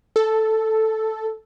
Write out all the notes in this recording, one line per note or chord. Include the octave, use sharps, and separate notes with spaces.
A4